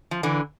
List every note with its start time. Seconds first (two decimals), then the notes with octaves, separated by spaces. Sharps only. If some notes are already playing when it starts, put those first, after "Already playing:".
0.11 F3
0.23 D3 E3